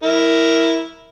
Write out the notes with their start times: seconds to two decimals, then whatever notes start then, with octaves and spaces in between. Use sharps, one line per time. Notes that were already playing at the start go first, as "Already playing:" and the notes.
0.03 E4 A#4